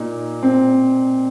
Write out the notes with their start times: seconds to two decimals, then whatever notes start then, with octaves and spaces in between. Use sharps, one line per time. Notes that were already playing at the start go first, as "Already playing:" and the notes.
Already playing: A#2 D#4
0.43 C4